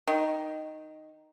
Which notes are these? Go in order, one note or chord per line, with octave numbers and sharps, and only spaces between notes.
D#3